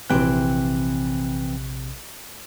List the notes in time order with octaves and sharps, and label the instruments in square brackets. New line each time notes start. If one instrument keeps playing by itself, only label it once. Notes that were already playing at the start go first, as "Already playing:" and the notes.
[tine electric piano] A#1 C3 F#6 [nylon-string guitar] E3 C4 G5